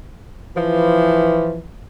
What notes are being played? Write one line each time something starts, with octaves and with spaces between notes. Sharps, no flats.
E3 F3